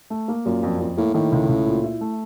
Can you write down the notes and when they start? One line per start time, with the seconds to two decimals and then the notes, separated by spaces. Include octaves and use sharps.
0.10 A3
0.28 A#3
0.45 F#2 A#2
0.63 F2
0.80 F2
0.97 A2 A#3
1.14 A2 D#3
1.32 C#2
1.49 C#2
1.66 A#2
1.84 E4
2.01 A3